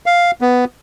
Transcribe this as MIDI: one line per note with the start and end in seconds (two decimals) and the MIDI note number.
0.06 0.31 77
0.41 0.65 59